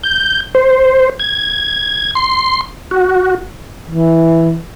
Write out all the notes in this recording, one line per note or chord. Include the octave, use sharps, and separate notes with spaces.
G6
C5
G#6
C6
F#4
E3